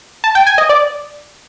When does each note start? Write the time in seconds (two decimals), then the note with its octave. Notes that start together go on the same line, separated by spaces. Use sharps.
0.24 A5
0.35 G5
0.47 G#5
0.58 D#5
0.69 D5